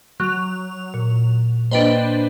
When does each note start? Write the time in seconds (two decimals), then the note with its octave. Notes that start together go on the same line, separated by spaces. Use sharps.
0.20 F#3 F7
0.94 A#2
1.71 A#3 D4 B4 C5 D#5 G5